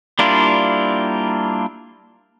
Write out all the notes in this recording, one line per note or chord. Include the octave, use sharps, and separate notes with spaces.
G3 A#3 D4 E4 F4